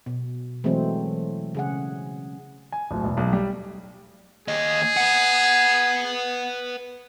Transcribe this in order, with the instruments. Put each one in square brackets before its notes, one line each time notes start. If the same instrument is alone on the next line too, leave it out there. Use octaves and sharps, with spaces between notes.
[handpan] B2
E3 F#3 G#3 A3 C4
C#3 G#4 F#5
[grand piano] G#5
D1
E1
B1
G3
[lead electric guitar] D#2 D#5 [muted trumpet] G#4
[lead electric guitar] B4 F#5